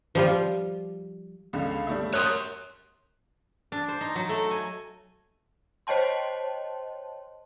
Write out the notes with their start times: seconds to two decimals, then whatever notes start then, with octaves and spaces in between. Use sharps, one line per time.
0.15 F3 G3 F4
1.53 C#2 D3
1.87 G3 A3 E5
2.14 A#4 C#5 C6 D#6 F#6
3.72 D4
3.88 C5
4.01 D#4
4.15 F#3
4.29 A3
4.51 G#5
5.87 C5 C#5 D#5 G5 A5 C6